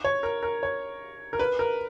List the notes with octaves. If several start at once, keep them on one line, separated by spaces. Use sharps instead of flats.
C#5
A#4
A#4
C#5
A#4
B4
A#4